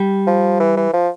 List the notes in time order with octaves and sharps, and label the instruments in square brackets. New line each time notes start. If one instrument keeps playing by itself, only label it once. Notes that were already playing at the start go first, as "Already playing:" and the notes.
Already playing: [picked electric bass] G3
[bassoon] F3
E3
E3
F3